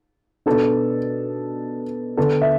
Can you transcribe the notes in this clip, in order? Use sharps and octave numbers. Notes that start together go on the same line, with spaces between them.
B2 B3 D4 A4
D3 B3 D4 A4
E5